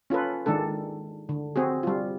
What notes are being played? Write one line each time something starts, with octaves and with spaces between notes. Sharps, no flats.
C#4 F4 A4 B4
D#3 G#3 D4 A4
D3
C4 F#4 G#4
G3 F4